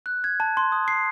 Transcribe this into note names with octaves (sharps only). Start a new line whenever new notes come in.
F#6
G#6
A5
C6
D#6
C7